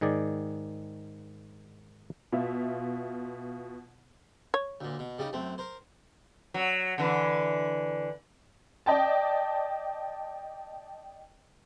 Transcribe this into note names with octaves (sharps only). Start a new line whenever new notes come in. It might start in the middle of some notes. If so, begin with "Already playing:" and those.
G#2 D#3 G#4 D5
B2 F4 E5
C#5
D2 A#2
B2
C#3 G3 D#4
F#2 A3 C4
A#4 C5
F#3
D3 E3
D5 D#5 G5 A5